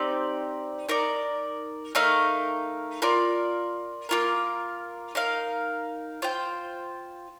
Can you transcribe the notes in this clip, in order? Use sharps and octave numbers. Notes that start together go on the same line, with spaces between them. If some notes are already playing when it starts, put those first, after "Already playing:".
Already playing: C4 D#4 G4 D5
D#4 A#4 D5
A3 D#4 A#4 F5
F4 A#4 D5
A#3 F4 A#4
D#4 A#4 F5
F4 C5 G5